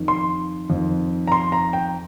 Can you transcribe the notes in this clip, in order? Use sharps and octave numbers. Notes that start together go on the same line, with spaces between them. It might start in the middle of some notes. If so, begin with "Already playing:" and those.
Already playing: F2 D#3
C6
F2 D#3
A#5
C6
A#5
G5